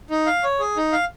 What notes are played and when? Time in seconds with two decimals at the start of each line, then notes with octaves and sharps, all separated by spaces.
0.10 D#4
0.26 F5
0.44 C#5
0.60 G#4
0.77 D#4
0.92 F5